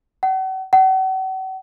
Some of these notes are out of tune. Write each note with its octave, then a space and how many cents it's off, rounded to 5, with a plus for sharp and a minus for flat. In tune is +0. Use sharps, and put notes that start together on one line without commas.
F#5 +40
F#5 +40